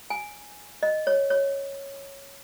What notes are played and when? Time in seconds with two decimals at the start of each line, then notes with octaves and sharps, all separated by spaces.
0.10 G#5
0.83 D#5
1.07 C#5
1.30 C#5